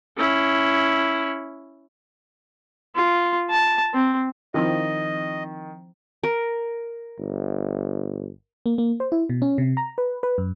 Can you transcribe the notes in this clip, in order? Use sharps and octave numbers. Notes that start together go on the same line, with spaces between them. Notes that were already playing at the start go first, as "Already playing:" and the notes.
C#4 E4
F4
A5
C4
D#3 F3 C4 E4 D#5
A#4
G1
A#3
A#3
C5
E4
B2
C#4
C3
A#5
B4
B4
F#2